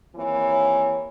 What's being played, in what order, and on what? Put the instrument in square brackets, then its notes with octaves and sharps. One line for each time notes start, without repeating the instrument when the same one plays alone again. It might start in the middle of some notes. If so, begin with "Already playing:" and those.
[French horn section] D#2 E3 A#3 C4 C#5